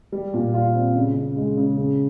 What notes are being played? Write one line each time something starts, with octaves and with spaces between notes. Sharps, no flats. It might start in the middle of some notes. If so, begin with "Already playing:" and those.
G3
A#2
F4
C4
C#3
C#3
G#3
C#3
C#3